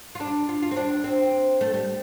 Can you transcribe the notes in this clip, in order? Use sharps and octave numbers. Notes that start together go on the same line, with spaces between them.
F4
D4
F4
F4
C4
D4
C4
A3
G3